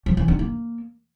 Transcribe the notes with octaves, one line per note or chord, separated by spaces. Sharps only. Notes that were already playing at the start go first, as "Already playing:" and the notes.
F3
E3
D#4
A#3